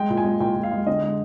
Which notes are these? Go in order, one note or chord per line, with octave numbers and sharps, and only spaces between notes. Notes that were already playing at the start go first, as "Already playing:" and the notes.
Already playing: G#3 G5
A#2
G#5
G#3
A#2 G5
A#2
F5
G#3
D3 D#5
G#3